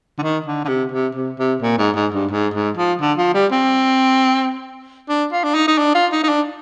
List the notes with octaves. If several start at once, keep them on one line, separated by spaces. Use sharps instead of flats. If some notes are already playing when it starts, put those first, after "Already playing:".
D3
D#3
D3
D3
C3
C3
C3
C3
A#2
G#2
G#2
G2
G#2
G#2
F3
D3
F3
G3
C4
D4
F4
D4
D#4
D#4
D4
F4
D#4
D#4
D4